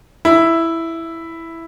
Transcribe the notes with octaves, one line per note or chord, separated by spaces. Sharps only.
E4